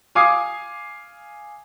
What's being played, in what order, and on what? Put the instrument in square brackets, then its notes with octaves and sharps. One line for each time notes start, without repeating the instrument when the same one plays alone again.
[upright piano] F5 G#5 D6 D#6 G#6 C7